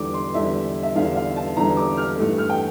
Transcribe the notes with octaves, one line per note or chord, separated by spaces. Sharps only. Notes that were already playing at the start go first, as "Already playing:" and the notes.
Already playing: E2 D3 G3 D6
C6
E2 D3 G3 E5
E5
E2 D3 G3 F5
F5
A5
E2 D3 G3 A#5
D6
F6
G2 E3 A3
F6
G5